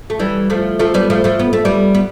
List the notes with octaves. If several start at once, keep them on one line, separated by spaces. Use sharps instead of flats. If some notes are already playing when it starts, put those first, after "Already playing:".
A3
E3 G3
F3 A3
F3 A3
G3 B3
F3 A3
F3 A3
B3
A3
G3 B3
B3